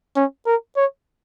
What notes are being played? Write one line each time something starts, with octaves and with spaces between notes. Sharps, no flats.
C#4
A#4
C#5